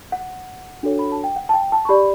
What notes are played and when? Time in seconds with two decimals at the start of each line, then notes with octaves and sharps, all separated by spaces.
0.12 F#5
0.83 D4 F#4 A4 C#5
0.99 B5
1.12 A5
1.24 G5
1.36 F#5
1.49 A5
1.54 G5
1.72 A5
1.85 C#6
1.89 G4 D5 B5